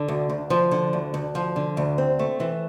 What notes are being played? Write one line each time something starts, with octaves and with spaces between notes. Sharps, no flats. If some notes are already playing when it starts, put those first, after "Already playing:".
Already playing: D3
D2
D2
F3
D3
D2
D2
F3
D3
D2
C4
A3
E3